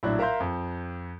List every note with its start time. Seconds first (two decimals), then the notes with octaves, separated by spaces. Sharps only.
0.03 A#1 A2 F#3 D4 E4 F#6
0.19 A#4 E5 F5 A#5 C6 G6
0.40 F2